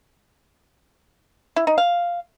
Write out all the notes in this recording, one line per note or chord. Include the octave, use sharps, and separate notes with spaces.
E4
D#4
F5